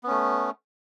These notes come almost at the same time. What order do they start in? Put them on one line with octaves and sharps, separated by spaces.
B3 C#4 A3